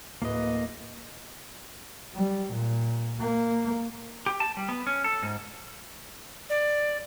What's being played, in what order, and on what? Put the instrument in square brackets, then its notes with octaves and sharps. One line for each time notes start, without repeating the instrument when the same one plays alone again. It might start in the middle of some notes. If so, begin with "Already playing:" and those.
[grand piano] D1 B4 [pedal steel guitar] A#3 D#5
[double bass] G3
A#2
A#3
[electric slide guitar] G4
A5
G3
B3
C#4
A4
G#2
[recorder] D5